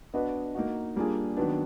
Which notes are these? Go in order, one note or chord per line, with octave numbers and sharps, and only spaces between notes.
B3 D4 F#4 B4 D#5
A#3 D#4 F#4
G3 A#3 D4 F4 G#4
D#3 F#3 B3 D4